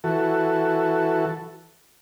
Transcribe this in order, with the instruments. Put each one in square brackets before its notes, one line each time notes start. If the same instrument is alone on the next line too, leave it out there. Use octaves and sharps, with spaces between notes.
[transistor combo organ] E3 F#4 A4